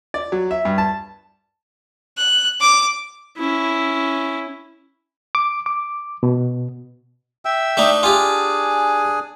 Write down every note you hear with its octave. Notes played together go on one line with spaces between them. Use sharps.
D5
F#3
E5
G2
A5
F#6
D6
C#4 E4
D6
D6
B2
E5 G5 E6
A3 D4 D#4
D4 F4 G4 G#4 G#5